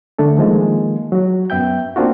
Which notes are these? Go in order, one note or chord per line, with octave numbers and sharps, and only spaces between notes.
D3 A3 D4 A4
D#3 F3 G#3 A#3
F#3 F#4
F#2 B3 E5 G5 G6
A#3 C4 D4 F4 F#4